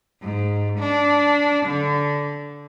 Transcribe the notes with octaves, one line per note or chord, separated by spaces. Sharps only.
G#2
D4
D3